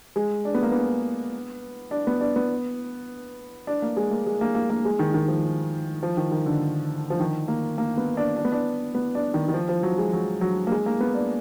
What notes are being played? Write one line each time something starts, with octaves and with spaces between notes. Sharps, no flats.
G#3
D4
B3
A#3
B3
D4
B3
D4
B3
D4
A#3
G#3
A#3
G#3
A#3
A#3
A#3
G#3
D#3
D#3
F3
F3
D#3
D#3
D3
F3
D#3
A#3
A#3
B3
D4
D4
B3
D4
B3
D4
D#3
D#3
F3
F3
F#3
G#3
F#3
F#3
A#3
G#3
A#3
B3
D4